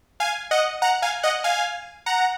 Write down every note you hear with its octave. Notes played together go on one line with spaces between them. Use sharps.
F5 G#5
D#5 F#5
F#5 A#5
F5 G#5
D#5 F#5
F5 G#5
F#5 A#5